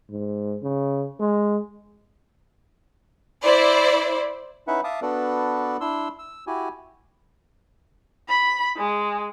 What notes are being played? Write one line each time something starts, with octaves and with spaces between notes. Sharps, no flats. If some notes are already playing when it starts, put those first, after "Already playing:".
G#2
C#3
G#3
E4 C5 D5
C#4 D#4 E4 B4 E5 F#5
E5 F5 A5 D6 D#6
B3 D4 F#4 A4 B4 D5
D4 E4 C6 E6
E6
E4 F#4 G4 G#5
B5
G#3